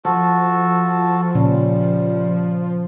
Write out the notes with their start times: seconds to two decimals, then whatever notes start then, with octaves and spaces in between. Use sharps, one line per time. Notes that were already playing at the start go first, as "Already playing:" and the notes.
0.05 F3 F#4 A4 A5
1.35 A#2 C#3 G3 C#4